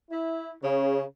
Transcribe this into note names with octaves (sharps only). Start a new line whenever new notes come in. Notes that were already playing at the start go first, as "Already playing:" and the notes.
E4
C#3